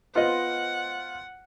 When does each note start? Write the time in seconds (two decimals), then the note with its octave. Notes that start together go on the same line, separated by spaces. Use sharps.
0.15 B3 F4 C5 D#5 F#5 C6